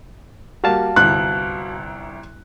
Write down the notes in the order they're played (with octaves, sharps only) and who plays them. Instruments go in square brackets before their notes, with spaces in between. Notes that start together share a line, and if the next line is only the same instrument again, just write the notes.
[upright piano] G3 A#3 [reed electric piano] F#4 F5 A5
[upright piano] G1 C2 [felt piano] F#6